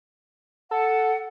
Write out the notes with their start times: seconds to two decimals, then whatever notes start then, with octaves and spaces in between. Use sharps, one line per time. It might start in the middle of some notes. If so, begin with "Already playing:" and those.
0.71 A4 F#5